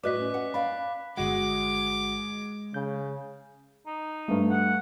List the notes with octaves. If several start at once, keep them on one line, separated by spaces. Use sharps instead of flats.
A2 F#4 B4 D5 D#5 D6 F#6 B6
C#4
F#5
D5 F5 B5
G1 G#3 F#4 F#5 D6
C#3 G6
D#4
G2 A3
F#5